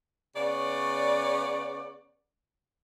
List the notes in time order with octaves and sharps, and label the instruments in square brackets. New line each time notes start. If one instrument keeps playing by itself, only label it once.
[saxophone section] C#3 B3 C#5 D5